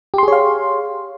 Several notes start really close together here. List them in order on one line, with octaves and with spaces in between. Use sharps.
G4 C6 G#4 C#5 F5